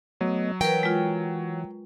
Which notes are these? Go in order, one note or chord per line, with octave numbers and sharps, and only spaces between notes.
F#3 A3 B3 D#5
E3 A#4 B4 G5
G#3 F4